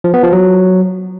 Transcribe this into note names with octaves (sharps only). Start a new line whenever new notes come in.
F3
B3
F3
F#3